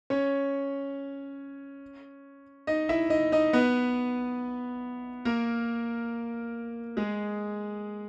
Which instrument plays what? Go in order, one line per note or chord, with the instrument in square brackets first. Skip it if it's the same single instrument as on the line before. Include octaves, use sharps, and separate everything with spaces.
[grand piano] C#4 C#5
D#4 D#5
E4 E5
D#4 D#5
D#4 D#5
B3 B4
A#3 A#4
G#3 G#4